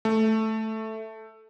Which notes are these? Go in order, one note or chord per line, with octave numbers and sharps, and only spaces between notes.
A3